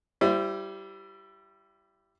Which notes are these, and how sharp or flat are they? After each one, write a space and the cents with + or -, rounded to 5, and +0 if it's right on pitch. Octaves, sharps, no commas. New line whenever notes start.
G3 -10 E4 +30 C5 +0